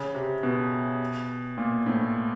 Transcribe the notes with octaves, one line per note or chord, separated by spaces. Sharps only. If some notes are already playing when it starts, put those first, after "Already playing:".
Already playing: C#3
C3
B2
A#2
A2